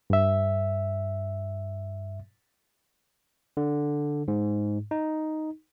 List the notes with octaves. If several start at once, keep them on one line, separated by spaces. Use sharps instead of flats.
G2 E5
D3
G#2
D#4